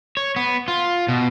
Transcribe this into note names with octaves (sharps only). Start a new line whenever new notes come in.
C#5
B3
F4
B2